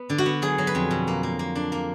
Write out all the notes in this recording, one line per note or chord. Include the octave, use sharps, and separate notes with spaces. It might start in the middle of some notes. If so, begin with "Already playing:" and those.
Already playing: B3
D3
F#4
B3
F#3 G#4
F#3
B4
F2
B2
A#3
A#3
A#3
D4
A#3